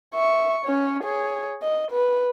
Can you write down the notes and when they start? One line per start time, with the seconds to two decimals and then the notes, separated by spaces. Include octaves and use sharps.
0.14 E5 C#6
0.65 C#4 C#5
1.04 G#4 C#5
1.62 D#5
1.91 B4